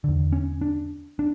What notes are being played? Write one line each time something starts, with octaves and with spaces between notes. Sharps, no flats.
E2 D3
C#4
D4
D4